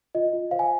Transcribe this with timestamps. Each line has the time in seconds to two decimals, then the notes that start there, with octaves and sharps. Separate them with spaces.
0.15 F4 D#5
0.33 F4
0.51 C5 F5
0.59 G#5